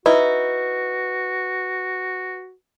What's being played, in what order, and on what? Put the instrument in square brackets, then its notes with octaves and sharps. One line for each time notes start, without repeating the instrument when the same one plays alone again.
[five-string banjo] D#4 E4 [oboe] F#4 [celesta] B4